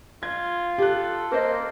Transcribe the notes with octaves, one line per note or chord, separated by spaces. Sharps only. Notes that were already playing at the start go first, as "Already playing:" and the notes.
F4 G#6
G4 A4 F#6
A#3 A#4 C5 D#5